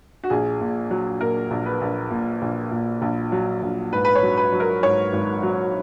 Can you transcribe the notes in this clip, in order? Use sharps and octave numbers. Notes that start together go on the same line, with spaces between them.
F#4
A#1 G#4
A#2
F#3
A#2 A#4
A#1
B4
A#1
A#2
A#1
A#2
A#1
F#3
A#1
G#2 B4
B4
C#5
F#3
B4
F#3
A#4
G#2 C#5
G#1
F#3